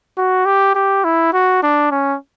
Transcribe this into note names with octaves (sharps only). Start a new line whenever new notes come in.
F#4
G4
G4
E4
F#4
D4
C#4